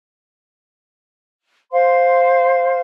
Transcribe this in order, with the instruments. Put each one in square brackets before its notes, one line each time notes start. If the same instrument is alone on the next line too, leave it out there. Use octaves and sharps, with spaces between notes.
[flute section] C5 F5 C6